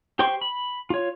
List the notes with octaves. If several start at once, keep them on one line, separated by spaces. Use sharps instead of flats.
G4 C5 G5 C6 C#6
B5
F4 C#5